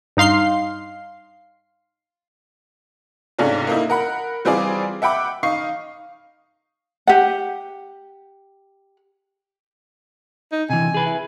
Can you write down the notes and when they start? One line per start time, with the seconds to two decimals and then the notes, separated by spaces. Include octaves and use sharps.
0.17 G2 D#4 F5 C6 C7
3.38 G#2 C3 A3 C#4 D4 F4
3.67 A#3 D#4 E4
3.90 A#4 F#5 B5
4.45 E3 G3 C4 F4 G#4 D5
5.02 E5 F#5 G5 B5 D6
5.43 D#4 F5 C#6 C7
7.08 G4 F#5
10.52 D#4
10.70 C3 E3 G#5
10.94 G#4 B4
11.06 E4